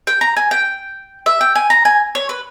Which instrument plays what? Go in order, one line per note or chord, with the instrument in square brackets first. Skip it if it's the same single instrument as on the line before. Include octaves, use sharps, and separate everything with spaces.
[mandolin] G5
A#5
G#5
G5
E5
G5
G#5
A#5
G#5
C#5
B4